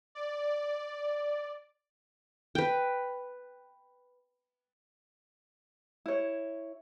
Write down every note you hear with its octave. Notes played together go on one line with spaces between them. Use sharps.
D5
B4 G5
E4 C#5